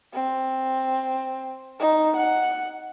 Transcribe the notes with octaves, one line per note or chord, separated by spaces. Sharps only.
C4
D#4
F#5